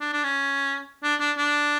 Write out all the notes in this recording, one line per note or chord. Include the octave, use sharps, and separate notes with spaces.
D4
D4
C#4
D4
D4
D4